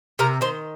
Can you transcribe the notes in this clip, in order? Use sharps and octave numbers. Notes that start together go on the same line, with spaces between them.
C3 A#4
D#3 C5